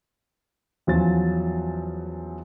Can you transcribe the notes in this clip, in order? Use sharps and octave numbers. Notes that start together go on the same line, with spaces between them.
E2 F3 F#3 C#4 A6